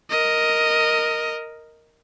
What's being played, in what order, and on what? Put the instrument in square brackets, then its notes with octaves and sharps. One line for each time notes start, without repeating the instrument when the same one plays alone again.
[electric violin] A#4 D#5